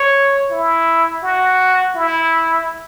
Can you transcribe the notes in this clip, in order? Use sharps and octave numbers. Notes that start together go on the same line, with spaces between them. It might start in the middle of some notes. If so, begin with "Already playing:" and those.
Already playing: C#5
E4
F#4
E4